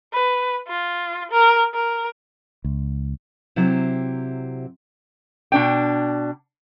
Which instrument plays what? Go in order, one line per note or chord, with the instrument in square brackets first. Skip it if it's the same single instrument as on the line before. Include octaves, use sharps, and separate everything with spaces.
[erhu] B4
F4
A#4
A#4
[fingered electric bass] C#2
[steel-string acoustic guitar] C3 F#3 E4 G4 C5
[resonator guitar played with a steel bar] B2 D4 G5